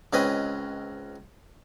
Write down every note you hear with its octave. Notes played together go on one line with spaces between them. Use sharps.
C#2 C4 C#4 B4 D#5